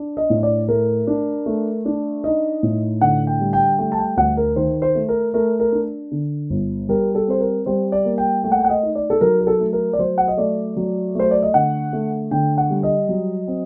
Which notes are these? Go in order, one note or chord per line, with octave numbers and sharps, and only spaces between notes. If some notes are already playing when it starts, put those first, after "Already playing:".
Already playing: D4
D#5
A2
D5
A3 A#4
D4
A3
D4
D#4 D#5
A2
D3 F#5
G5
G3
G5
A3 G5
A5
G5
D2 F#5
A#4
D#3 C5
C5
A3
A#4
A3 A#4
A#4
D4
D3
G1
G3 A#4
A4
C4 C5
A#4
G3 C5
D5
A#3
G5
A3 G5
F#5
G5
F#5
D#5
D#4
D5
A4
F#3 A#4
A#4
A4
A3
A#4
D5
F#3 C5
F#5
D#5
A3 D5
F#3
A3 C5
D5
D#5
D3 F#5
A3
D3 G5
F#5
G3
D#5
F#3
C4